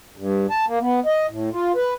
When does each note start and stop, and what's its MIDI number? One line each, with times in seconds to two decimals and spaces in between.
0.17 0.46 43
0.50 0.65 81
0.67 0.79 58
0.81 1.00 59
1.06 1.26 75
1.29 1.50 45
1.53 1.72 65
1.75 1.94 71